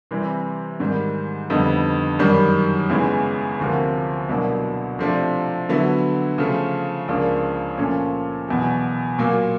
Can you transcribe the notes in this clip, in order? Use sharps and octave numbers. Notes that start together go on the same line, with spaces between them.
C3 E3 G3
G#2 D#3 G3
F2 D3 G3 B3 D#4
F#2 D#3 G3
E2 C#3 E3 G#3
D2 C3 F3 A#3
C2 B2 F#3 A#3 D4
C3 F3 A3 D4
D3 F#3 B3 E4
C#3 F3 A3
C#2 C#3 F3 A#3 D4
A#2 F3 A3 C#4
E2 B2 F#3
A#2 F#3 A#3